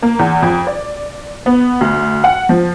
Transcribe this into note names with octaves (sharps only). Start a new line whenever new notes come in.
A#3
E2
F2
D5
B3
D2
F#5
F3